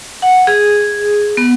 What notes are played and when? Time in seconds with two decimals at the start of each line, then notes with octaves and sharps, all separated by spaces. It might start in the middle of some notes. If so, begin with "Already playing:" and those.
0.22 F#5
0.47 G#4
1.37 B3